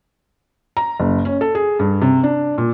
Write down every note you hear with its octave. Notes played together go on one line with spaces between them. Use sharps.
A#5
F#1
C#4
A4
G#4
G2
C3
D4
A#2